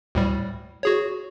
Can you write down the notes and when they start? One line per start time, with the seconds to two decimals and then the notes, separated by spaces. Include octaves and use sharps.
0.15 D2 A2 G3
0.83 F#4 G#4 C#5